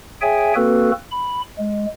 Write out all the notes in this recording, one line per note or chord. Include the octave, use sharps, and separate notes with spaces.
G#4 C#5 E5 G5 G#5
A#3 C4 F#4 A4 B4
B5
G#3